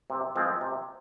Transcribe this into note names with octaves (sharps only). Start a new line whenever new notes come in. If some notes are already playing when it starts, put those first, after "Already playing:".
C3
F3 G#3 C4
C3